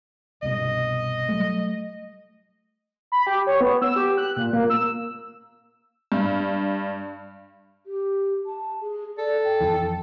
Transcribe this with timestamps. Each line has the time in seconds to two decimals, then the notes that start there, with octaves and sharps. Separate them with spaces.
0.42 C2 G2 B2 D#5
1.28 F#3 G3 A3
3.12 B5
3.27 G4
3.47 C#5
3.61 B3
3.82 E6
3.96 G4
4.17 F#6
4.37 A#2
4.53 A#3
4.70 E6
6.12 G2
7.86 G4
8.46 A5
8.81 G#4
9.18 A4 D5
9.44 G5
9.61 F2 E3